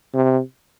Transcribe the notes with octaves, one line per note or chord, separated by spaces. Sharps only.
C3